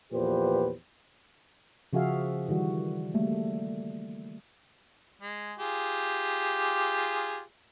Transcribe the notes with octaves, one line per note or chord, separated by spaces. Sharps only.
E2 A#2 F3 G4 B4 C5
C#3 F3 F#4 G#4 E5 F5
D#3 E3 G3 F#4
G3 A3 A#3
G#3
F4 G4 G#4